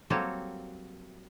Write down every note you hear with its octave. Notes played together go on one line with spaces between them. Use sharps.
F#3 G3 A#3 C4 A4 C#5